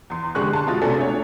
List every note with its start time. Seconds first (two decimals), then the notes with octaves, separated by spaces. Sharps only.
0.10 E2 C6
0.35 D3 G#3 G4 C#6 F#6
0.53 A5 C6
0.67 B2 G#3 F4 A6
0.82 C3 A3 D4 F#4 G#4 A4
0.98 D4 C#5